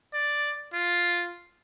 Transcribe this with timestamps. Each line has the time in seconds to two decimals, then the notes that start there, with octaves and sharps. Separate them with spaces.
0.14 D5
0.74 F4